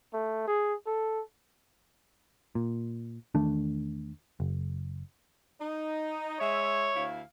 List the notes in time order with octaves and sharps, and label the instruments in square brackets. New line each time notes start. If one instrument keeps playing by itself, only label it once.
[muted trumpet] A3
G#4
A4
[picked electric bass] A#2
E2 D#3 A3 D4
F#1
[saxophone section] D#4
[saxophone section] G#3 E5 [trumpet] C#5
[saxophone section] D2 E4 F5